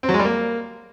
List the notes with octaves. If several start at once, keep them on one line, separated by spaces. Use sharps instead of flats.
C4
F#3
G#3
G3
A#3